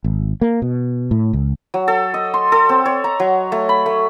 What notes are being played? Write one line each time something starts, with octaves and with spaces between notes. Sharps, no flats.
G#1
A#3
B2
A2
C#2
F#3
A4
D#5
C6
A4
C4
C#5
A#5
F#3
A3
B5
A3